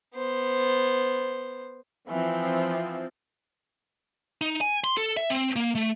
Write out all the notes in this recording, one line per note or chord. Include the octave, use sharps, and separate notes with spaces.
B3 C5
E3 F3 C4
D#4
G#5
C6
A4
E5
C4
A#3
A3